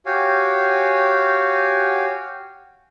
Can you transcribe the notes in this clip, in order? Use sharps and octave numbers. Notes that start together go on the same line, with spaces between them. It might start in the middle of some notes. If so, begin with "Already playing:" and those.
F#4 G4 C#5 F5 G5 G#5